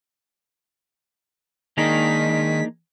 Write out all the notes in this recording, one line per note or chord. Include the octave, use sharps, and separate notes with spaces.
D#3 G#3 A#3 D4 D#4 B6